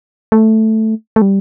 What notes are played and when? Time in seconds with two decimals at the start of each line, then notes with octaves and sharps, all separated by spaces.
0.32 A3
1.16 A3
1.22 G3